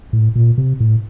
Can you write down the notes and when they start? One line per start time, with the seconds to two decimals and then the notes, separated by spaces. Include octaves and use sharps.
0.13 A2
0.36 A#2
0.58 C3
0.80 A2